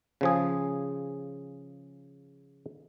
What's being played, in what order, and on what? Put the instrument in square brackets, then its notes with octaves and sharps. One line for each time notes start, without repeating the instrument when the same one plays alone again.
[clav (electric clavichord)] C#3 F3 G#4